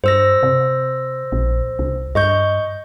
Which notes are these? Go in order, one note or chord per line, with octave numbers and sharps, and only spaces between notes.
G2 C5 E6 A#6
C3
A#1
C2
G2 D#5 C#6 G6